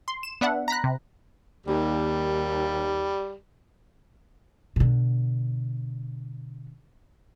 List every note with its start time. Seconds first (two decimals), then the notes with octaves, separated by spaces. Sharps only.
0.08 C6
0.23 E7
0.41 B3 D4 E5 F#5
0.68 A#5 B5 F#6
0.84 C3
1.67 D#2 G3
4.76 B2 D3